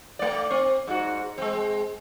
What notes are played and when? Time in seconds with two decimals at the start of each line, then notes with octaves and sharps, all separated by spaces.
0.19 A3 D5
0.51 C4
0.87 G#2 F#4
1.38 G#3 C4